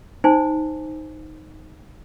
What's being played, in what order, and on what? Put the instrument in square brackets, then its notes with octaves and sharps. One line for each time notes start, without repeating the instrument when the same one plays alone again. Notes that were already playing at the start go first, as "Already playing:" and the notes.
[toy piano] D#4 C5 G#5